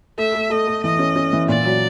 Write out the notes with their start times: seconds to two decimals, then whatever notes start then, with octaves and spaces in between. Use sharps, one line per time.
0.18 A3 E5
0.34 A3
0.50 A3 D#5
0.67 A3
0.83 E3 D#5
0.99 C#4
1.16 C#4
1.33 E3
1.48 A#2 D5
1.65 F#3